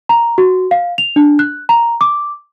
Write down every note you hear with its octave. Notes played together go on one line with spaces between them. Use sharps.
A#5
F#4
F5
F7
D4
F#6
A#5
D6